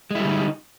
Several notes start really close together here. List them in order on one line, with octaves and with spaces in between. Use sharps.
G#3 E4 G3 D3 D#4